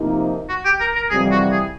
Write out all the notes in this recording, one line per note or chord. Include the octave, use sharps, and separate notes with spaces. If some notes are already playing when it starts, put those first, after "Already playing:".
Already playing: C3 F3 A#3 D#4
F#4
G4
A#4
A#4
F2 C3 E3 G3 G#4
F#4
G#4